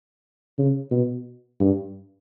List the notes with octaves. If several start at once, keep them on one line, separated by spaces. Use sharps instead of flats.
C#3
B2
G2